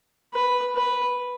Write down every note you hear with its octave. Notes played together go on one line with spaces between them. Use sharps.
B4
B4